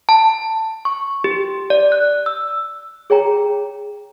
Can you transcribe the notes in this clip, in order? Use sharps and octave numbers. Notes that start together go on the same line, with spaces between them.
A5
C#6
G4
D5
F#6
E6
G#4 C#5 G5 A#5